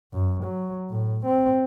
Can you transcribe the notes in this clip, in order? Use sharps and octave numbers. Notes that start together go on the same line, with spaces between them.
F#2
F#3
A2
C4